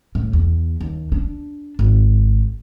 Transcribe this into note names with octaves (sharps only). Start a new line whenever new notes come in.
A2
E2
D#2
D4
G#1